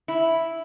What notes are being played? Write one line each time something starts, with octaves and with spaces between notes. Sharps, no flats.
E4